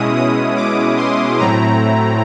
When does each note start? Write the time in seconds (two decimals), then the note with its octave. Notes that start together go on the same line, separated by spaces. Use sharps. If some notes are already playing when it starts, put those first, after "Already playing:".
Already playing: B2 G#3 C#4 E4 D#6
0.17 D#6
0.57 D6
0.98 C6
1.39 A2 F#3 A3 C4 E4 A#5